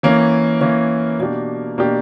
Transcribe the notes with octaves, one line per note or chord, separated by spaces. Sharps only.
E3 A#3 C#4
E3 A#3 C#4
B2 A#3 D4 G4
B2 A#3 D4 G4